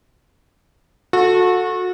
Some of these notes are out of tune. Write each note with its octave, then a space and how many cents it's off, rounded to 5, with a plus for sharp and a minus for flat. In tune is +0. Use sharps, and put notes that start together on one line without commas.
F#4 -30 A4 +0